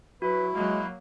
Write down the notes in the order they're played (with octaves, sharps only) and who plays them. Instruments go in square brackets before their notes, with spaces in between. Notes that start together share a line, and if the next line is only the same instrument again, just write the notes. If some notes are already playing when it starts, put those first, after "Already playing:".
[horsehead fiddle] F#3 [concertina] E4 [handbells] F#4 [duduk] B4
[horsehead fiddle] F#3 A#3 [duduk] G#3